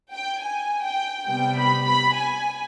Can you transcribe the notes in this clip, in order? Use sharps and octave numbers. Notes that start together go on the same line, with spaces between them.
G5
G#5
G5
C3 G3 B3 G5
B5
B5
G#5